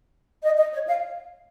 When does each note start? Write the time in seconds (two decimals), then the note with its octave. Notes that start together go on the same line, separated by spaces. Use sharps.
0.44 D#5
0.58 D#5
0.73 C#5
0.86 F5